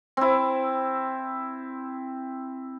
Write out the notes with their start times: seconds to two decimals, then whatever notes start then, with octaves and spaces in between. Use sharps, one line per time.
0.17 C4 E4